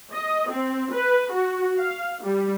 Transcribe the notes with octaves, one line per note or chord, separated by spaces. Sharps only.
D#5
C4
B4
F#4
F5
G3